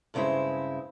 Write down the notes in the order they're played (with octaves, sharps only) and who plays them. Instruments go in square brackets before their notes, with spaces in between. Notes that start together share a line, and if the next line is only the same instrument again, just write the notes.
[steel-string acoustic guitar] G2 C#3 G#3 C4 E4